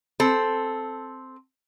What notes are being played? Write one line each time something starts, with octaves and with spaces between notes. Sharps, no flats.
C4 A4